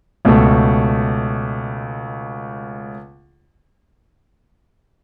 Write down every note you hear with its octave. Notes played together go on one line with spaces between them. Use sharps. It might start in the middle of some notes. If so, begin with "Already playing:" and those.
C#2 B2 A3